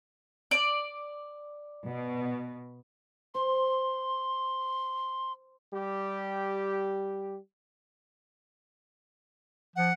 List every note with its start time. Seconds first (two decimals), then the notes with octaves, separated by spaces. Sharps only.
0.51 D5
1.87 B2
3.35 C5 C6
5.74 G3 G4
9.76 F3 F#5